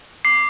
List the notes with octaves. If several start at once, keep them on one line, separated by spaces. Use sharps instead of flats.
D6 C7